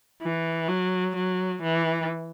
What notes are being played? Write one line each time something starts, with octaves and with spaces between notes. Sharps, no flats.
E3
F#3
F#3
E3